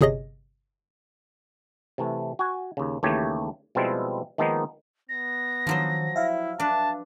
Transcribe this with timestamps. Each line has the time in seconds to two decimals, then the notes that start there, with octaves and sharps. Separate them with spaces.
0.01 G1 C3 G#4 C#5 D#5 A#6
1.98 C3 E3 A3
2.39 F#4 G#5
2.77 D#2 C#3
3.03 D#2 C#3 E3 A3 G4 C#5
3.75 B2 F3 G3 G#3 C4 E4
4.38 D#3 F3 G#3 A#3 B3 D#4
5.09 B3 A#6
5.67 D#3 F3 F#3 C5
6.16 E4 E5 F5
6.60 D4 B4 A5